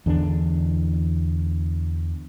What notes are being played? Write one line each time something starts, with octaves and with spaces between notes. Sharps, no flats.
E2 D3 C4 D4